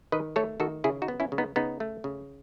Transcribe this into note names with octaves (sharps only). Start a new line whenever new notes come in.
D#3 B4 D#5
A3 A4 C#5
D#3 F#4 A4
C#3 E4 G#4
D#4 F#4
B3
C#4 E4
C#3
B3 D#4
C#3 B3 D#4
A3
C#3